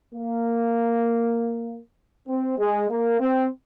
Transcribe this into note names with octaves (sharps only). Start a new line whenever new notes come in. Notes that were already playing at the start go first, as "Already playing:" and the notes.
A#3
C4
G#3
A#3
C4